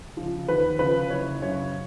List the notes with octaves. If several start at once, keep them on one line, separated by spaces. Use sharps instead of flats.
C#3 F3
D#2 B4
C#3 F3 B4
F#1 C#5
F#2 C#3 C#5